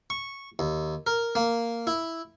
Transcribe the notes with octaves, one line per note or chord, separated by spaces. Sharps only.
C#6
D#2
A#4
A#3
E4